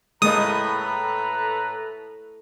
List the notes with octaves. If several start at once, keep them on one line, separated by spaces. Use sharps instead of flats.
A2 G#3 A#3 A4 B4 D#5 A#5 D#6